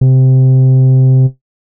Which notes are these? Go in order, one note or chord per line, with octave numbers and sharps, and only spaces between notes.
C3